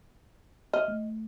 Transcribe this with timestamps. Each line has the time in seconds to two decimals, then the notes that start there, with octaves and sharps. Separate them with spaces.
0.73 D#5 E5 F6
0.88 A3